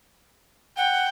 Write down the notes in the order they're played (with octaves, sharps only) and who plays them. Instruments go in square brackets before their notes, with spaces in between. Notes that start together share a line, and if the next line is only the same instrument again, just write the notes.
[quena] F#5 [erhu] G5